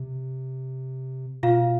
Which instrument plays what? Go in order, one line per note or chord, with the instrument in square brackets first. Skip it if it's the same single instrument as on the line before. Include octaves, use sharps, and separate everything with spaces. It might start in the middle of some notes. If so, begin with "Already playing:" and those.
Already playing: [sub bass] C3
[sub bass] B2 [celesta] F4 F5